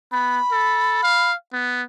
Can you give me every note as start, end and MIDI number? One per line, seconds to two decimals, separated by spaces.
0.12 0.39 59
0.12 1.29 83
0.52 1.00 69
1.03 1.34 77
1.53 1.83 59